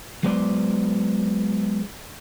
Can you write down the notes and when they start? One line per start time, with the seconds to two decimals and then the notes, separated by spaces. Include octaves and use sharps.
0.23 F#3 G#3 B3 C5 D5